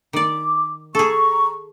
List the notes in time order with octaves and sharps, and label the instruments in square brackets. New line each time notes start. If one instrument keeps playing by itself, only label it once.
[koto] D#3 D5 [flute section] D6
[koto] G#4 A4 [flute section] A#5 C#6